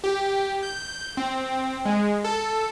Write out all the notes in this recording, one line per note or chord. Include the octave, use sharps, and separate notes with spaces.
G4
G6
C4
G#3
A4